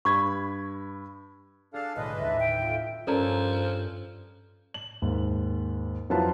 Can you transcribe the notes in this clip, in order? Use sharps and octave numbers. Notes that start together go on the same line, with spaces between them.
G2 B5 C#6 G#6
D4 G#4 A4 F5 F6 C7
B1 A2 D3 G#3 D4 B4 D#5
D#2 A2 E5
G5
F2 F3
G2 F3 C#4 A4 A#4 D5 A#5
F#7
D#2 G#2
F2 F#3 E4 F4 B4 A5